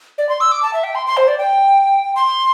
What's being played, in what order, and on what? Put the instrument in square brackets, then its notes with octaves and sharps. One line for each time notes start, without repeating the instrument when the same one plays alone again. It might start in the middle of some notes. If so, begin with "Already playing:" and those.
[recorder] D5
C6
E6
D6
A5
E5
G5
C6
C6
C5
D5
G5
C6